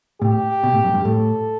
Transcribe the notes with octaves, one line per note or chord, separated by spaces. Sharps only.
A2 G4
B2
A2
F#2
G2
A2 A4